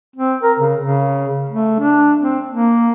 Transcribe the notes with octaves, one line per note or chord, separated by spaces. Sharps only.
C4
A#4
C#3
C#3
A3
D4
C4
A#3